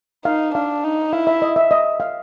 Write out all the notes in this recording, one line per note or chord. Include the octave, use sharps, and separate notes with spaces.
D#4 F5
D4 F5
D#4
E4 F5
E5
D#5
E5
D#5
F5